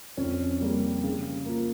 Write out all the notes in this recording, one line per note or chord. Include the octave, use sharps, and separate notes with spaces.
F2 C#4
C#3 G3 A#3
C#3
F3 A#3